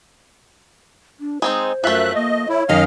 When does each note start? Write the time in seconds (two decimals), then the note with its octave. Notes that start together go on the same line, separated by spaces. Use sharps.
1.20 D4
1.42 G#3 C4 D#4 C5
1.84 F#2 F3 A3 E5 F#6
2.15 A#3 D#5
2.49 E4 C#5
2.69 F#2 D#3 D#5 F5 F6